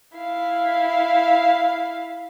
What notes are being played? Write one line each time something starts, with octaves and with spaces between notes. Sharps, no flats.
E4 F5